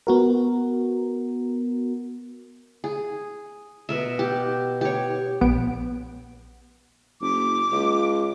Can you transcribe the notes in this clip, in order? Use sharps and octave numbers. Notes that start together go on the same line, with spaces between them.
B3 F#4 A#4
G#4
B2 A#4 E5
G4
G4 C#5
A#1 B3 D7
F#1 D6
C#2